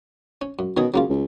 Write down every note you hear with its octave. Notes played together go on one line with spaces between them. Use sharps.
C#4
F#2
B2 D#3 C#4 G#4
C#3 F#3 A#3 F4
C#2